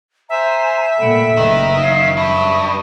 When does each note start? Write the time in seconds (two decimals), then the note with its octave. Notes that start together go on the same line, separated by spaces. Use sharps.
0.29 C5 E5 G#5 A#5
0.99 A#2 A3 F#5 G5 B5
1.37 F#1 D#3 B4 D#5 A#5
1.80 F#2 C#5 F5
2.17 G2 E5 C#6 D#6